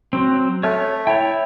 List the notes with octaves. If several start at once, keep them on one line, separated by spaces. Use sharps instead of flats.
F#3 C4
A3 C#5 G#5 F6
E4 C#5 G5